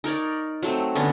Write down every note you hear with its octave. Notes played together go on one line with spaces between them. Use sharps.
D#4 A#4 C#5 D5
F#3 A3 C4
D3 B3 C#4